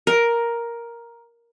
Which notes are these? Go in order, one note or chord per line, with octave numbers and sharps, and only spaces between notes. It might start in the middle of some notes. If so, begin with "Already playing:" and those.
A#4